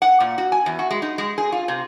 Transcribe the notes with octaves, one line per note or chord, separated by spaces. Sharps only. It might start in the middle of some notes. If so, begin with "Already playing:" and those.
F#5
A#2
F#4
G#5
E2
F#4
G#3
D#4
G#3
G#4
F4
C3